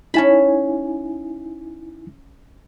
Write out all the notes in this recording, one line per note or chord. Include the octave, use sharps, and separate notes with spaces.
C#4 D#4 E4 G#5 A5 B5